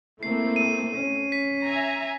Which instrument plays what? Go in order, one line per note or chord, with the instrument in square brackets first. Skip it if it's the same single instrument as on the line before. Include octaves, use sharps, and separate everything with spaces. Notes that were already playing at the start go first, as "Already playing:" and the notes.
[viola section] A3 C4 [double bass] A#3 E4 [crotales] C7
[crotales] D#7
[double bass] C#4
[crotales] B6
[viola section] E5 G#5 A#5